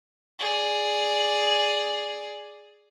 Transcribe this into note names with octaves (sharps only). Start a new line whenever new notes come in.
G#4 D5